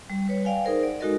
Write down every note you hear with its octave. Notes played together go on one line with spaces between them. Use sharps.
G3
G3 B4 C#5
D5 F5 G5 G#5
D#4 G#4 A#4 C5 D5
D5 F#5
G#3 D#4 F#4 A4 A#4 D#5